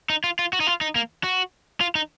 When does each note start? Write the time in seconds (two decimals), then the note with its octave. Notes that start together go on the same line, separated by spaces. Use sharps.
0.10 D#4
0.24 F4
0.39 F4
0.53 F#4
0.60 D#4
0.67 F4
0.81 D#4
0.96 A#3
1.24 F#4
1.81 F4
1.95 D#4